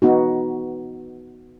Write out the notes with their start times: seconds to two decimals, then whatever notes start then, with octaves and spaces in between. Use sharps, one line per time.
0.02 B3 D#4 F#4